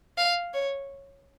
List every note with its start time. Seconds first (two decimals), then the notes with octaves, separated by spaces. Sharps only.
0.18 F5
0.54 C#5